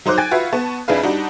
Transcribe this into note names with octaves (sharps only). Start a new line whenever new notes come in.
F#3 D#4 C5 D6 F#6
G5 G#5 G#6 A6
F4 F#4 B4 E5 F5
B3 A5 C#6
F2 D4 E4 G#4 B4 F5
G3 D4 D#4 F#4